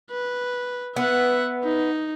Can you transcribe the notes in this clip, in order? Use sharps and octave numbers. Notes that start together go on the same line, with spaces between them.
B4
B3 E5 F#5
D#4